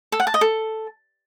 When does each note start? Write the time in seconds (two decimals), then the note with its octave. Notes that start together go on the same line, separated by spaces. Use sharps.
0.12 A4
0.20 F#5
0.27 A5
0.34 D#5
0.41 A4